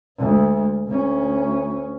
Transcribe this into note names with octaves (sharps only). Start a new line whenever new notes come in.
D2 G#3
D2 C#4